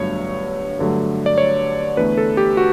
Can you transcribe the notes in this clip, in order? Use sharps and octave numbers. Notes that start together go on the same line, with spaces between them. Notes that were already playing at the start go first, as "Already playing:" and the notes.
Already playing: G1 G2 F#3 A3 C#5
G2 D3 F#3 A3
D5
C#5
E2 D3 A3 B4
A4
G4
F#4